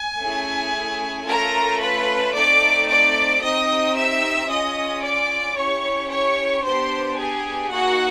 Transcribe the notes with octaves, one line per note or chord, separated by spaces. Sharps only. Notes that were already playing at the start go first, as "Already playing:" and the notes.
Already playing: G#5
A3 C#4 E4 G#4
A3 C#4 F4 A4 A#4 A#5
B4 B5
A3 C4 D#4 D5 D6
D5 D6
C4 D#4 G4 D#5 D#6
E5 E6
C#4 F4 G#4 D#5 D#6
D5 D6
C#4 E4 G4 C#5 C#6
C#5 C#6
B3 D4 G4 C5 C6
G#4 G#5
A#3 D#4 F#4 G#4 F#5